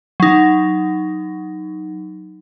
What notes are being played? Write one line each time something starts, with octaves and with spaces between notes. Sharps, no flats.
F#3 D#4